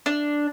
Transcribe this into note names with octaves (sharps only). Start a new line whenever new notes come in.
D4